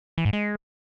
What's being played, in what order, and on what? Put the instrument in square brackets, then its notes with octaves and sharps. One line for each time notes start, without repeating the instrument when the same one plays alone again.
[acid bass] E3
G#2
G#3